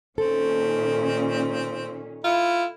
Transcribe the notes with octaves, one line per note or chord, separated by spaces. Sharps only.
A#2 D#3 C4 C#4 A4
E4 F4